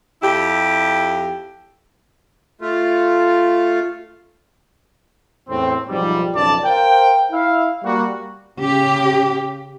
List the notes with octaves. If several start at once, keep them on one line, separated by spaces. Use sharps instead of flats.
F2 E4 G4
A3 F4
E2 A2 C4
B1 G#2 F3 G3
B1 F2 C#3 D5 A5
A#4 C5 F5 G5
E4 E5 F5
G3 A#3 F#4
C#3 G4